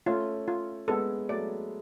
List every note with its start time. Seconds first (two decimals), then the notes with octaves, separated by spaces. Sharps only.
0.06 A3 C#4 F4
0.48 F4
0.88 G#3 B3 A4
1.29 F#3 A3 D5